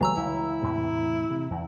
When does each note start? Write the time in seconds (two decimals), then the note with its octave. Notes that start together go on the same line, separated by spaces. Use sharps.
0.01 C#2 E3 F#3 G3 A3 A#5 E6
0.17 C#2 E4
0.62 E2 A2 C3
1.30 C3
1.50 E2